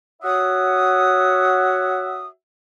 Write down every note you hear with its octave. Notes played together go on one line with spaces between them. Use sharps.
F#4 C#5 E5 F#5 D#6